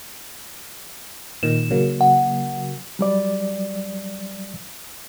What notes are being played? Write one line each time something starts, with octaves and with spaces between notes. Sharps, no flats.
A#2 D#3 E7
C#3 F#3 A#3
F#5
F#3 G3 D5